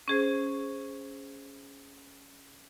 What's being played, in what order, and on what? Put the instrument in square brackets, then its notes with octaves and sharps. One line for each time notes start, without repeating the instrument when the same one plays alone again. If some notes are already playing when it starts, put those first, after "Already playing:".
[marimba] C#4 G#4 C5